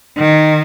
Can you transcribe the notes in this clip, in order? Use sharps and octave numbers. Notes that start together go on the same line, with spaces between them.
D#3